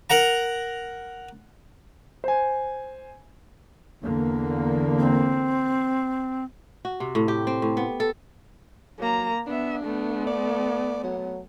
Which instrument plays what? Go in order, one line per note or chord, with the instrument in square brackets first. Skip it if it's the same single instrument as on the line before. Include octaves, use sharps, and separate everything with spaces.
[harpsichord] A#4 F#5 A#5
[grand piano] C5 G#5
[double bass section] E2 D3 A#3
[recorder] C4
[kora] F#4
C3
A2
G4
C4
A2
B3
A4
[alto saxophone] F#3 [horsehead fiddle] A#3 A#5
[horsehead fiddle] B3 E5 [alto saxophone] D4
[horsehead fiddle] A3 B3
[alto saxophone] D5
F#3